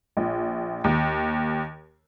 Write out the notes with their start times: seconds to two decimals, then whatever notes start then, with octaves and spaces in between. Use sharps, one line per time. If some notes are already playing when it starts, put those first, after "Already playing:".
0.17 A#1
0.84 D#2